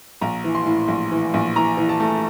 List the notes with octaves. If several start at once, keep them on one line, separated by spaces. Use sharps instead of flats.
A#1 A#5
E3
C6
A2
A#1
E3
A#1
E3 A#5
E3
A5
A3